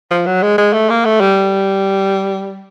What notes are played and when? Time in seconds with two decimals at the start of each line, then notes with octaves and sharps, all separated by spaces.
0.11 F3
0.26 F#3
0.43 G#3
0.58 G#3
0.73 A3
0.90 A#3
1.05 A3
1.21 G3